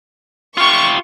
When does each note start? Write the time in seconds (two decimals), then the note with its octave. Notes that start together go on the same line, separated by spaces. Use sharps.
0.57 F4 G4 C#6